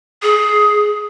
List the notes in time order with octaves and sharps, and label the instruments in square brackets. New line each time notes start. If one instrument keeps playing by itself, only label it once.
[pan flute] G#4